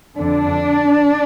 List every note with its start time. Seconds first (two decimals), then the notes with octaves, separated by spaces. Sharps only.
0.18 F2 D3 D4